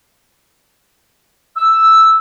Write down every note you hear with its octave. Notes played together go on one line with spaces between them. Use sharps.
E6